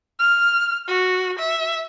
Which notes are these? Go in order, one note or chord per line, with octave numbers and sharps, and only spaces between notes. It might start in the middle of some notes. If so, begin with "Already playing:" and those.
F6
F#4
E5